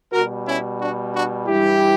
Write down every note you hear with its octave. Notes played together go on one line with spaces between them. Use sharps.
B2 G3 F#4 A#4
C#4 E4
D4 F#4
D4 F#4
G2 E3 G3 E4 G4